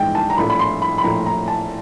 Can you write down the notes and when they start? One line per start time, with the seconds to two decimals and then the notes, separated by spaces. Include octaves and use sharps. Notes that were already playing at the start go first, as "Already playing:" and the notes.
Already playing: A#1 G#2 E3 G#3 G5
0.15 A5
0.30 A#5
0.37 A#1 A2 F3 B5
0.50 B5
0.59 C6
0.82 B5
0.98 B5
1.03 A#1 A2 F3 A#5
1.26 A#5
1.48 A5